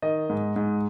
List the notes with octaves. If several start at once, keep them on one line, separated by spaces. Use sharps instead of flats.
D#3 D#5
G#2
G#2